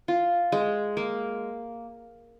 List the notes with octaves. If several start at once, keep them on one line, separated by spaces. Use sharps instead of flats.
F4
G#3
A#3